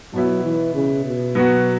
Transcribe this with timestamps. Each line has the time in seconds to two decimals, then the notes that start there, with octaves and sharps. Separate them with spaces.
0.13 B2 F#3 B3 E4
0.44 E3
0.74 C#3
1.05 B2
1.35 F#3 B3 F#4